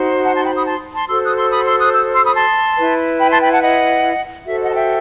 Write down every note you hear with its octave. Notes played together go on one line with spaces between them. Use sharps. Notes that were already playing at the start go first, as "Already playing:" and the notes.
Already playing: D#4 F#4 C5
F#5 A5
A5 C6
G5 B5
B5 D#6
A5 C6
A5 C6
F#4 A4 C5 C6 E6
D#6 F#6
C6 E6
B5 D#6
C6 E6
D#6 F#6
E6 G6
C6 E6
B5 D#6
A5 C6
E4 B4
G5 B5
A5 C6
G5 B5
F#5 A5
D#5 F#5
F#4 A4 C5 E5
D#5 F#5
A5
E5 G5